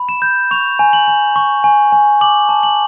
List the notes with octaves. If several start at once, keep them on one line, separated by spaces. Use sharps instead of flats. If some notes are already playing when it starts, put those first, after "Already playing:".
Already playing: B5
E7
G6
C#6 F7
G#5
F#7
G#5
C#6
G#5
G#5
D6 F#7
A5
F#7